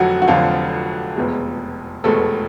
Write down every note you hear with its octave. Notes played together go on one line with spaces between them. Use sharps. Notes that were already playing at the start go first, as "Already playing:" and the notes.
Already playing: F1 F2 D3 F3 F#3 F#4
F#4
F1 F2 D3 F3 F#3 F4
F1 E2 B2 G#3
F1 E2 B2 G#3 A3 A4